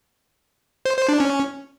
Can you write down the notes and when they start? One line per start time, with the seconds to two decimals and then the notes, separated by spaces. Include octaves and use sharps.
0.85 C5
0.97 C5
1.09 D4
1.20 C#4